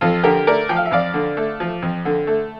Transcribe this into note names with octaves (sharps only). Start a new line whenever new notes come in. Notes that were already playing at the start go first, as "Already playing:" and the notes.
F2 F4 A4
D3 G4 A#4
A3 A#4 D5
F3 G5
F5
E5
F2 D5 F5
D3
A3
F3
F2
D3
A3